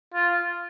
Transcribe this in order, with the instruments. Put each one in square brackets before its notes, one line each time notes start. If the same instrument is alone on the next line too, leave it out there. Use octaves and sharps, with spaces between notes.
[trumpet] F4